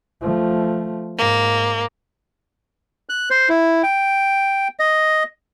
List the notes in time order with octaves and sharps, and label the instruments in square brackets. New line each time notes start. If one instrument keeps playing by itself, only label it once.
[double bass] F3 A3
[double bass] G#2 [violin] A#3
[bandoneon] F#6
C5
E4
G5
D#5